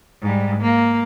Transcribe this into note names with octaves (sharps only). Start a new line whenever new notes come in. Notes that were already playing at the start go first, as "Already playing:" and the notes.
G#2 G3
A#3